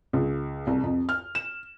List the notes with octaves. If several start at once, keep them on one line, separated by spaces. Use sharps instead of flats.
C#2
C2
F2
F6
E7